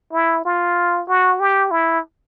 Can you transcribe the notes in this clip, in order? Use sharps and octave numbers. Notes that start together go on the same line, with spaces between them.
E4
F4
F#4
G4
E4